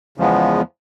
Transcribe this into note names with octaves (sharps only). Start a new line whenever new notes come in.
E2 C#3 F3 G#3 B3